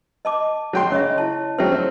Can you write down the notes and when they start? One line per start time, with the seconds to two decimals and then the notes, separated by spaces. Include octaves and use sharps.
0.25 D#5 A5 D6
0.73 F#3 G5 C6
0.92 C#3 C#5 D#5 E5
1.18 E4 C#5 A5
1.58 F#3 C4 C5 E5 G5
1.72 C4